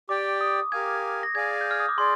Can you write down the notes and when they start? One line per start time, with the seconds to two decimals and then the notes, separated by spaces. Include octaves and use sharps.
0.09 G4 D5 G5 D6
0.41 D#6
0.72 G4 A#4 F5 G#5 G#6
1.23 A#6
1.35 G#4 D5 F5 G#5 G#6
1.61 G6
1.71 F6
1.80 D#6
1.89 D6
1.98 G#4 D5 C6